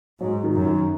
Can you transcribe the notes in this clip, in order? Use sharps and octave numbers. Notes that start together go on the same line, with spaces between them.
G#2 F#3
D#3
F#2
D#3